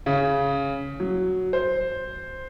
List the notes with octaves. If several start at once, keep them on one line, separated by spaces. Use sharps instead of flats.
C#3
F#3
C5